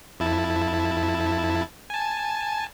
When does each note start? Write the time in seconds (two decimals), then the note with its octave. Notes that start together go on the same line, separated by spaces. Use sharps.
0.20 F2 E4 A5
1.90 G#5 A5